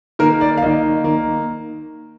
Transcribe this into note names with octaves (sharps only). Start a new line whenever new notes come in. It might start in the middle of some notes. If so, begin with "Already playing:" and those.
D#3 A#3 A#4
D5
F5
D#3 A#3 D#5
D#3 A#3